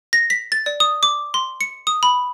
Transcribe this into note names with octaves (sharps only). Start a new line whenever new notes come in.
A#6
B6
A6
D5
D#6
D6
C6
C#7
D#6
B5